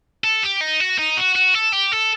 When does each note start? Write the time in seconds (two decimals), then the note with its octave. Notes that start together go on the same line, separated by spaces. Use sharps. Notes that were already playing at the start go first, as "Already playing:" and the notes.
0.24 A4
0.43 G4
0.61 D#4
0.80 F#4
0.99 D#4
1.17 F#4
1.36 F#4
1.55 A4
1.73 G4
1.92 A4